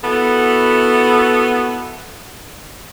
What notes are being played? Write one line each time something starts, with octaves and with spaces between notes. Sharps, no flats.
B3 E4 F#4 A4